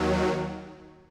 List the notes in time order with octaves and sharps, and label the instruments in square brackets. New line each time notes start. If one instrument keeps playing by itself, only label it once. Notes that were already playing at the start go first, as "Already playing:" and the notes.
Already playing: [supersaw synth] D#2 D#3 F#3